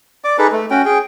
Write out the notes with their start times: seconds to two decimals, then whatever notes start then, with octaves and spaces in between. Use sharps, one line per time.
0.24 D5 D6
0.38 D#4 G#4 A4 B4
0.52 A3
0.71 C#4 F#4 G5
0.85 G#4 G5